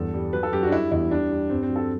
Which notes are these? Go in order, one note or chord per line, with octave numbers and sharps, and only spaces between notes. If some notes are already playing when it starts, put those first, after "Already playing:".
Already playing: E2 G2 A4
G3
F#3 B4
A4
F#2 G4
D4 F#4
G3 E4
E2 E4
G3 D4
G3
G2 C4
C4
F#3
A4